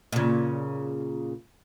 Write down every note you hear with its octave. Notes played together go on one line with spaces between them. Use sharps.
A#2 C#3